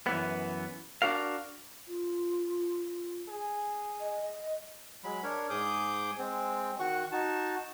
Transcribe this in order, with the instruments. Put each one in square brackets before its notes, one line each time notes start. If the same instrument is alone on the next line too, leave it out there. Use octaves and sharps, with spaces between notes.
[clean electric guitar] F#2 E3 B3
D4 F#4 A#4 F5
[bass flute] F4
[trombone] G#4
[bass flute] D#5
[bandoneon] F#3 G#3 B5
D4 A#4 C#5
G#2 G#4 D6 D#6 G6
G#3 C4
D#3 F#4 F#5 C#6
D#4 F#4 A5